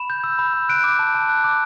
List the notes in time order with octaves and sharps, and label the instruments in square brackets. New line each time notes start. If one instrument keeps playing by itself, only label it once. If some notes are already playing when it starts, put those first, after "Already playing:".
Already playing: [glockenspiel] B5 E7
G6
E6
B5
B5
F#6 D7
D6
A5
A5
F#6
D6